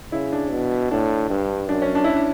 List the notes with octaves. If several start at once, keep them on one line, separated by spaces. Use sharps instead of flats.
C#3 E4
D4
B2
A2 D4
G2
F#2 D4
C#4
D4
E4
D4